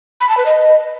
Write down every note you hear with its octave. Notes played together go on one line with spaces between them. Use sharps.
B5
A5
B4
D#5